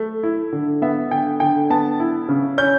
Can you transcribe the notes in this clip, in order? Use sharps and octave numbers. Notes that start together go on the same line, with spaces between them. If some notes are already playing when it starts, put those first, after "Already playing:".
Already playing: A3
E4
D3
B3 E5
D3 G5
D3 G5
B3 A5
E4
C#3
C#4 G6